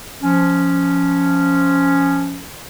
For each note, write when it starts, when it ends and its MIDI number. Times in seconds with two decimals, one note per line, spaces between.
0.22 2.44 53
0.22 2.44 61